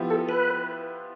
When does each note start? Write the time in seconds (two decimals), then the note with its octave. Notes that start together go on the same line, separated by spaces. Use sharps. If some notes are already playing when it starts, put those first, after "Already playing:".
Already playing: F3 B3 E4 G4
0.10 A4
0.29 B4